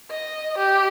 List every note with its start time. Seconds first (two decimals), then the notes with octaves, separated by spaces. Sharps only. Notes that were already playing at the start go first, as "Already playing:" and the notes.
0.11 D#5
0.58 G4